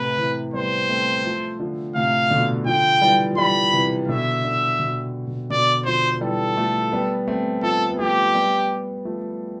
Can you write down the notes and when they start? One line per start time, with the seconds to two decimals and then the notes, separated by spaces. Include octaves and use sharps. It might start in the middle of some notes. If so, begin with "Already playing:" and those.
Already playing: A2 C3 B4
0.18 C3 E3
0.53 G3 B3 C5
0.89 A3 C4
1.24 F3 A3
1.60 D3 F3
1.95 A2 C3 F5
2.30 B2 D3
2.66 D3 F3 G5
3.02 E3 G3
3.31 F3
3.37 E3 G3 B5
3.73 C3 E3
4.08 B2 D3 E5
4.44 B2 D3
4.79 B2
5.27 B2
5.50 B2 D3 D5
5.85 D3 F3 C5
6.21 E3 G3 A4
6.57 F3 A3
6.92 G3 B3
7.27 A3 C4
7.63 F3 A3 A4
7.90 B3
7.99 F3 A3 G4
8.35 G3 B3
9.05 F3 A3